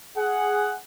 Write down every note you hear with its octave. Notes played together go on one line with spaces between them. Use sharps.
G#4 F#5